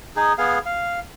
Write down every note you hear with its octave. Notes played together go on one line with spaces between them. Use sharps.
D#4 G#4
B3 G#4 F5
F5